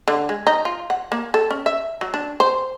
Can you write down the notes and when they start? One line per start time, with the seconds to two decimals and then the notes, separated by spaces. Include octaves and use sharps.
0.08 D3
0.29 G#3
0.47 D#4
0.65 F4
0.90 F#5
1.12 A#3
1.34 A4
1.50 C#4
1.66 E5
2.01 F#3
2.14 D4
2.40 C5